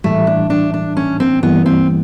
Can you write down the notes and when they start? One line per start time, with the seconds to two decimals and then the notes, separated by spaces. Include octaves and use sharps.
0.04 A2 E3 G3 A3
0.27 D4
0.50 D4
0.74 D4
0.97 C#4
1.20 C4
1.43 G2 E3 G3 A#3 B3
1.66 C4